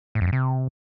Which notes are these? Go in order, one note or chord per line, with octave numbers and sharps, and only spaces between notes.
A2
F2
F#2
C3